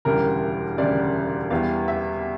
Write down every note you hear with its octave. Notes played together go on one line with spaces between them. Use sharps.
E1 D2 C#3 G3 A#4
E1 D2 C#3 G3 D5
E2 E3 G3 F5
E5